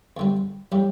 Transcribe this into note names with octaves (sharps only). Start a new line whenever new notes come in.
E2 D3 G3
A2 G3 G4